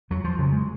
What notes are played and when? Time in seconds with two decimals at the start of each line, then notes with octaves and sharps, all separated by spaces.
0.10 F2 F#3
0.24 F3
0.39 C#3 F#3
0.53 G#3